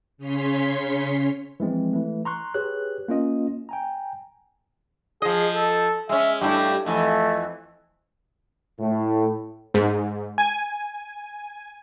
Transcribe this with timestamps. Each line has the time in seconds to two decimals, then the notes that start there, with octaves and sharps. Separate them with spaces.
0.17 C#3 C#4 C#5 C6 B6
1.60 E3 F3 G#3 C4
1.93 E3 A3
2.25 A#5 C6 C#6 F#6
2.54 G4 G#4 B4 C#5 F#6
3.08 A#3 C#4 F4 D#5
3.69 G5 G#5 A#5
5.22 F3 G#4 D#5
5.55 A4
6.09 G#3 C#4 E5
6.41 G2 A3 E4 G4
6.86 F2 E3 A3
8.80 A2
9.74 G#2
10.38 G#5